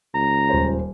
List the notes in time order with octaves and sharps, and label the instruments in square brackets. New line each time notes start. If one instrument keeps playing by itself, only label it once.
[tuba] C#2 [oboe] A#5
[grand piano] D#1 C5